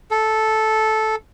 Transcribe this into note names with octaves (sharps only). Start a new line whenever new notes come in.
A4